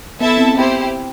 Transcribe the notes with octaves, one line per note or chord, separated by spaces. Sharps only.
B3 E4 A4 E5 A5
C4
C4 E4 G4 C5